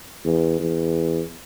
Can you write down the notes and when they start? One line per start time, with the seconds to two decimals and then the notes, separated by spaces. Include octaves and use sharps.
0.24 E2
0.60 E2